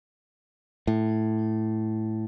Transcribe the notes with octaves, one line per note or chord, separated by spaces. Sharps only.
A2